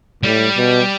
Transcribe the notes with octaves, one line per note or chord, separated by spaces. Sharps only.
A2 G3
B2